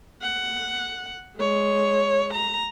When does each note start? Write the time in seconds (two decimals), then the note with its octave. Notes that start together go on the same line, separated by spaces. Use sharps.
0.22 F#5
1.38 G#3 C#5
2.34 A#5